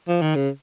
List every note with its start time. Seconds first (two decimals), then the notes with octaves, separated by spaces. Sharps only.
0.08 F3
0.21 D#3
0.35 C#3